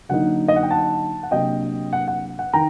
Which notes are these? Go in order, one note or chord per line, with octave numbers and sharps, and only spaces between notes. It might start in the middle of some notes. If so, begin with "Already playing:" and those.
D3 F#3 A#3 D#4 F#5
D#5
F#5
G5
F#5 A5
F#5
C3 F#3 A#3 D4 D#5 G5
F#5
F#5
F#5
D#3 G5 A#5